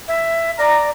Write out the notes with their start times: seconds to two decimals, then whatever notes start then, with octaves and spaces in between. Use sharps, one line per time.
0.08 E5
0.59 D5 A#5